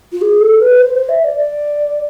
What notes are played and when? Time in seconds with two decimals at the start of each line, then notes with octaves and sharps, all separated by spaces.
0.12 F4
0.21 G#4
0.40 A4
0.60 B4
0.80 C5
0.94 C5
1.09 E5
1.23 D5
1.37 D5